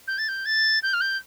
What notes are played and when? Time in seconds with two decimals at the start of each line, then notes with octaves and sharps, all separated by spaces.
0.07 G6
0.18 A6
0.28 G6
0.45 A6
0.83 G6
0.93 F6
1.01 G6